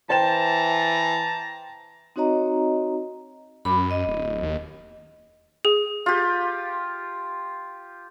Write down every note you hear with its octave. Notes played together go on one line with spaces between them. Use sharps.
E3 C5 G5 A5 A#5 E7
C4 D#4 F#4 C#5 D#5 A#5
F#2 B5 D6
D#5
D1
D#2
G#4
F4 G4